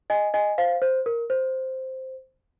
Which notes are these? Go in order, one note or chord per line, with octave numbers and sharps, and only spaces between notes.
D#5 G#5
D#5 G#5
C5 F5
C5
A#4
C5